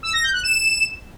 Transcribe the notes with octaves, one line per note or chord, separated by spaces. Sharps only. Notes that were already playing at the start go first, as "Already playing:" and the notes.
E6
A#6
G6
F#6
E7